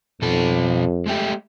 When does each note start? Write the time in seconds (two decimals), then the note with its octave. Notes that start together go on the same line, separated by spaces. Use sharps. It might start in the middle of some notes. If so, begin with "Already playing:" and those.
0.22 F2 B2 A4
1.06 G#3 A3 G4